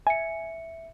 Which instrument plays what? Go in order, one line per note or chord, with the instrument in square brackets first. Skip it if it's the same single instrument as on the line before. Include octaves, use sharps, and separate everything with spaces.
[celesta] E5 C#7 [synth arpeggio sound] G#5